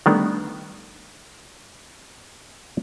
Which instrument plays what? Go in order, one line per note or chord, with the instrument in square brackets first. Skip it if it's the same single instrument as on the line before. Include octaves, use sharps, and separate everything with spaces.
[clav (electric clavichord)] D#3 G3 A3 B3 D4